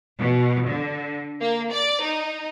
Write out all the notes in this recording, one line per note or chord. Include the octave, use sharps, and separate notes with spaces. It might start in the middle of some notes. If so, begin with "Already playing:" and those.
B2
D3
A#3
D5
D#4